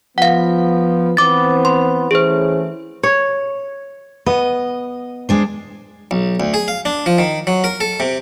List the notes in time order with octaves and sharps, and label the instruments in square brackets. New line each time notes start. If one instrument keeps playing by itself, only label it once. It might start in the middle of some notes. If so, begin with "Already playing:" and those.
[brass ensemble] F3 B3 [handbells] F5 F#5
[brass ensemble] E3 B3 C4 [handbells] D6 A6
[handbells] C6
[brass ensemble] E3 A3 C#4 [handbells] G#4 C5
[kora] C#5
[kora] B3 [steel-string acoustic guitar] D#5
[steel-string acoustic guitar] G#3 D4 C5
[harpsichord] B1
D2
G#4
F5
D4
F3
D#3
F#3
A#4
A4
C3